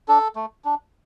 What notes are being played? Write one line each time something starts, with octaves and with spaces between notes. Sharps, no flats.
D4 A4
A3
D4